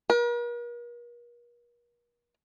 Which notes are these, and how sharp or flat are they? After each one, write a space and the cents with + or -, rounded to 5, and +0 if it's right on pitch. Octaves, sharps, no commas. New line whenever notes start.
A#4 +45